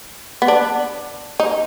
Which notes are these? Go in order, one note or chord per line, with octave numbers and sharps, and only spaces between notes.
B3
D4
D#4